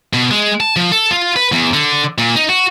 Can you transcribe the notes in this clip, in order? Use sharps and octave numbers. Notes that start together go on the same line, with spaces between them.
B2
G#3
A5
F3
A4
F4
B4
E2
D3
A#2
D#4
F#4